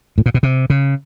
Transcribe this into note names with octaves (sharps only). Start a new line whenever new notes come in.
A2
A#2
B2
C3
C#3